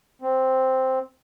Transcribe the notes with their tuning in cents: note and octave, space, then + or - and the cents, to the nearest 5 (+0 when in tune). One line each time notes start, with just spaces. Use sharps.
C4 +0